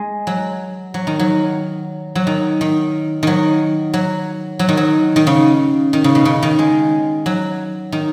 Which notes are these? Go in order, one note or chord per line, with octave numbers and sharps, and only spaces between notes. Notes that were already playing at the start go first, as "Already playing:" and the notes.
Already playing: G#3
F#3
F#3
D#3
F#3
F#3
D#3
D#3
D#3 F#3
F#3
F#3
D#3
F#3
D#3
C#3
D#3
C#3
B2
C#3
D#3
G#3
F#3
D#3